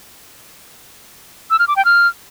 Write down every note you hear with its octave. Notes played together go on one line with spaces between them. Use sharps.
E6
F6
D6
G5
F6